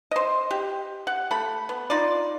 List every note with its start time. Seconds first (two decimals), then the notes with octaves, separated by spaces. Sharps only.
0.11 C5 D#5
0.51 G4
1.07 F#5
1.31 A3 B5
1.69 B3
1.90 D#4 F4 D5